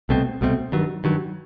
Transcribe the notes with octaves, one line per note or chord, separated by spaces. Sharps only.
C2 B2 A3 C4
C2 B2 A3 C4
G2 D#3 F#3
G2 D#3 F#3